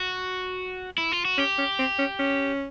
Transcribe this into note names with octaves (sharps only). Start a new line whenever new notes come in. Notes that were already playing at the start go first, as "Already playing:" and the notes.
Already playing: F#4
E4
F4
F#4
C#4 G4
C#4
C4
C#4
C#4